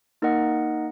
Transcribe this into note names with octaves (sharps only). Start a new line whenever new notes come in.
A#3 D#4 A#4 D#5 F#5